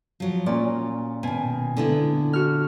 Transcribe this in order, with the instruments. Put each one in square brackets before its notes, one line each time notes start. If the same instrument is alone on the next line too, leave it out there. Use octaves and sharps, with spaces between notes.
[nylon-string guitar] F3 F#3
[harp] A#2 C#4 [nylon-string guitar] D5
[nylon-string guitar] B2 D#3 [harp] G#5
[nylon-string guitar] D3 B3 E4
[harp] F#4 F6